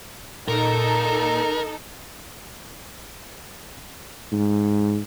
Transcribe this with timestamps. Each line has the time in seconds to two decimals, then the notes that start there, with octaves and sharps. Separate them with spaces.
0.48 A#2 D#4 A4 A#4
4.32 G#2